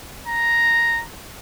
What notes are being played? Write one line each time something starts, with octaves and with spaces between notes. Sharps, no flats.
A#5